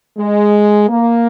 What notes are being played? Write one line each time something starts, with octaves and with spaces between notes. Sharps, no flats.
G#3
A#3